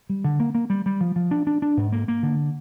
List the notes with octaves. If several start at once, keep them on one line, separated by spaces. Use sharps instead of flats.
G3
D3
A#3
A#3
G3
G3
F3
F3
D4
D4
D4
G#2
A#3
A#3
D3